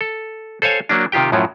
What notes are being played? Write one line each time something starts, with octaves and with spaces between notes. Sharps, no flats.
A4
A4 C5 C#5 F5 G#5
F#3 A#3 D4
C3 D#3 F4 G4 G5
F#2 A2 F3 F#3